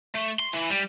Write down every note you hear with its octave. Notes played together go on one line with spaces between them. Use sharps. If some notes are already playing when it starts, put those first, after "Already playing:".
A3
C6
E3
G3